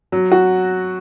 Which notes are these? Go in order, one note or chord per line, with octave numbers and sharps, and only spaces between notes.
F#3
F#4